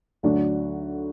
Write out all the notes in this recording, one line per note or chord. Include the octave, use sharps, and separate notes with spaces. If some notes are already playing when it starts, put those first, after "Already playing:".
D2 D3 F#3 D4 F#4